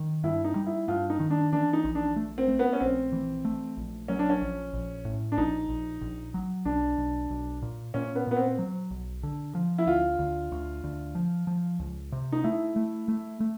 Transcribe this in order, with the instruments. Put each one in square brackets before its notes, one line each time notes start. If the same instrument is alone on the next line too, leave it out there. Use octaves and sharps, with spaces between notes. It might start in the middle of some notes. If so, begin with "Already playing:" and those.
Already playing: [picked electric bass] D#3
[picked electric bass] G2 [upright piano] E4
[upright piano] D#4
[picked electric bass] G3
[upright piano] E4
[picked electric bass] G2 [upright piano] F4
[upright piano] D#4
[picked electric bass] D#3
[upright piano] D4
[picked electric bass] E3 [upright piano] D4
[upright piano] D#4
[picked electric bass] A#1
[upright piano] D4
[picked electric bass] A3
[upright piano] C4
[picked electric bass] A3
[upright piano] B3
C#4
[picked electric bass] A#1 [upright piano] C4
[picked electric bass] E3
A3
A#1
[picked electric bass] F#3 [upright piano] C#4
[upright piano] D4
C#4
[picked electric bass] A#1
A#1
A2
[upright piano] D4
[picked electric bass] A#1 [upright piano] D#4
[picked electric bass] A#1
A#1
F#3
[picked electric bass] B1 [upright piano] D4
[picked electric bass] B1
B1
A#2
[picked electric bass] A#2 [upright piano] C#4
[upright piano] B3
[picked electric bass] A#2 [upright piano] B3
[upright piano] C4
[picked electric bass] F#3
B1
D3
F3
[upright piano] E4
[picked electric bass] D2 [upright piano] F4
[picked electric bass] D2
D2
D2
F3
F3
C#2
C3
[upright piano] D#4
[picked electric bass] A3 [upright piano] E4
[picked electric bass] A3
A3
A3